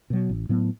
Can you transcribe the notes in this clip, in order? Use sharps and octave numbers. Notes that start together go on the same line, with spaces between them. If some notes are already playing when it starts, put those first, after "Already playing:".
B2 F#3
A1
A2 F#3 B3